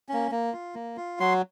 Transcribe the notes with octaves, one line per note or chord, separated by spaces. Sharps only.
A#3 C#4
A#3
F4
A#3
F4
F#3 C6